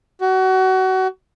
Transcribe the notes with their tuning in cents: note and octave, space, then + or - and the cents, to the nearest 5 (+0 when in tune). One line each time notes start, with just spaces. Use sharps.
F#4 +25